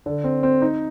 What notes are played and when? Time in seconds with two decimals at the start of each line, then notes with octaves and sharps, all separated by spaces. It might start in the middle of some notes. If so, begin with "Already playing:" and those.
0.06 D3
0.24 C4
0.43 C4
0.62 D#4